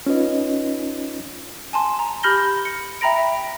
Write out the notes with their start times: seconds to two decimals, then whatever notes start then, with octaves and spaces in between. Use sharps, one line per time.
0.06 C#4 D#4 F4 B4 D#5
1.73 G#5 A5 C6
1.99 A#5
2.23 G4 B5 F6 G6 A#6 G7
2.65 C#7
3.01 E5 G5 A#5 B5 A#6 D7
3.18 E5